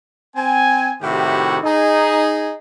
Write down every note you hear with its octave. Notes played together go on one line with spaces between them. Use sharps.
C4 G#5
A2 C3 D#3 E4 F#4 G4
D#4 G#4